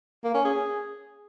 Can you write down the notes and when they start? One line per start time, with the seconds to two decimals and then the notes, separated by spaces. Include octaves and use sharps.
0.24 A#3
0.34 C#4
0.45 G#4